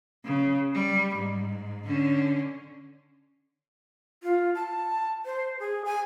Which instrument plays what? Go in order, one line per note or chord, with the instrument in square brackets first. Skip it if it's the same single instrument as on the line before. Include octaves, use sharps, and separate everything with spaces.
[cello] C#3
G3
G#2
D3 C#4
[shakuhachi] F4
A5
C5
G#4
G#5